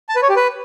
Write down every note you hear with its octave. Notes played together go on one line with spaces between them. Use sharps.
A5
B4
C#5
G4
B4